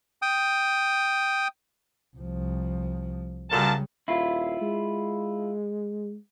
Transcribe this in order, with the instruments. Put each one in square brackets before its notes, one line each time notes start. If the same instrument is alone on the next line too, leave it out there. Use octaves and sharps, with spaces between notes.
[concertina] G5 D#6
[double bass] C2 F3
[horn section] F#2 A#2 A5 [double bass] C#3 G3
[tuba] D#1 [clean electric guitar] E4 F4
[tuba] G#3